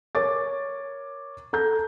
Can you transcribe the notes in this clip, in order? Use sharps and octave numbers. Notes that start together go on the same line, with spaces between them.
A#4 C#5 D6 A6
A4 A#5 G6